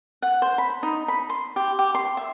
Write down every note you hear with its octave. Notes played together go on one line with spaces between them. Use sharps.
F#5
C5
B5
D#4
B5
C6
G4
G4
C6
E5